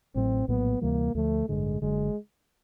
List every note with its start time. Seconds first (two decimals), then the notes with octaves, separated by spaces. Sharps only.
0.15 A1 A2 F#3 C4
0.48 A#1 A2 F#3 A#3 B3
0.81 D2 C3 E3 G3 A#3
1.14 D2 D3 F3 A3
1.48 A1 G2 D3 G#3
1.82 F#1 F#2 D3 G#3